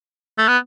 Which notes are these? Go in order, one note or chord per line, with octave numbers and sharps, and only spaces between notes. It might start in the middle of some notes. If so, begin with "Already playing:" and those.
A3
B3